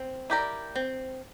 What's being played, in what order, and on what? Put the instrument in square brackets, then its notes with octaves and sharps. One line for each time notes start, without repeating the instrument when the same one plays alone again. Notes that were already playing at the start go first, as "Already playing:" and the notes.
Already playing: [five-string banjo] C4
E4 G4 A#4 D5
C4